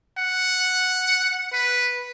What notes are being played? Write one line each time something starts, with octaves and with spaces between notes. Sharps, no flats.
F#5
B4